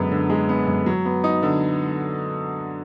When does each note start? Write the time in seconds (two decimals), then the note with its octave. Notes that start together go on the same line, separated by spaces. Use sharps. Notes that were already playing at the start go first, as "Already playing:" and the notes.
Already playing: F#2 D3 G#3 B3
0.11 D3
0.30 G#3
0.49 B3
0.67 F#2
0.86 F#3
1.05 B3
1.24 D#4
1.43 D3